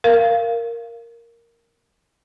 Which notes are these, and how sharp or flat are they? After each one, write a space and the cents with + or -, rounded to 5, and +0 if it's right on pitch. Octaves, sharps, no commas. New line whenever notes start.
A#4 +0 F5 -15